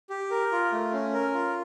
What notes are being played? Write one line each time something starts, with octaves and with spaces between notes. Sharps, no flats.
G4
A#4
F4
A3
C#4
A#4
F4